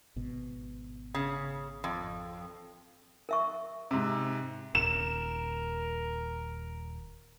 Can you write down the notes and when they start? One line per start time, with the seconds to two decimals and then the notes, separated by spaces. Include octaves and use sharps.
0.16 G#1 B2
1.14 C#3
1.84 F2
3.29 A#4 E5 C#6
3.91 G#2 C3
4.75 D#1 A#4 E7